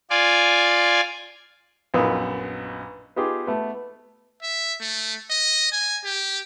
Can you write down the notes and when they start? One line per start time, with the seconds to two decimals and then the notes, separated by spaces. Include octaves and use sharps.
0.10 F4 D5 G#5
1.94 A#1 F#2 B3 D#4 D#6 E6
3.16 B3 D#4 F4 G4 G#4
3.47 A3 B3
4.43 E5
4.81 A3
5.30 D#5
5.72 G#5
6.05 G4